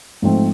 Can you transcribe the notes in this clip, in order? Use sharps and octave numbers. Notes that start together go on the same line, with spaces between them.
G#2 F3 A3 C4